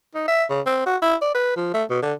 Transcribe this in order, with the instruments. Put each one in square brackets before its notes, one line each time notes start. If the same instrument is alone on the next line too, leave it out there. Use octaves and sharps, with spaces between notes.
[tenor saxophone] D#4
E5
C#3
C4
F#4
E4
D5
B4
F3
A3
B2
D3